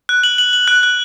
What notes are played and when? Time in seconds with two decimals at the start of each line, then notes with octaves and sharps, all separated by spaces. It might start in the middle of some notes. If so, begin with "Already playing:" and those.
0.09 F#6
0.23 F#7
0.38 F#7
0.53 F#7
0.68 F#6
0.83 F#6